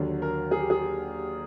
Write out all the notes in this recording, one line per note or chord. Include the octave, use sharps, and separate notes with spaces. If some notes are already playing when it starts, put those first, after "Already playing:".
Already playing: D#2 D3 F#3
A#4
G#4
G4
G#4
G4